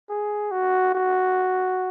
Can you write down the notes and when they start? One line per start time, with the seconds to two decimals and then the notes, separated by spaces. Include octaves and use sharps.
0.09 G#4
0.51 F#4
0.95 F#4